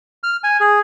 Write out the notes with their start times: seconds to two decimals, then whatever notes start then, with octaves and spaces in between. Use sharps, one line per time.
0.24 F6
0.44 G#5
0.60 G#4